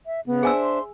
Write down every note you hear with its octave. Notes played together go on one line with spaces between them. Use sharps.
E5
C#3 B3
D4 G#4 C5 E5 G#5 E6
C6